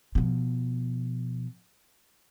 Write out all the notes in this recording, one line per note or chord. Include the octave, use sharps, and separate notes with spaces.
B2 F3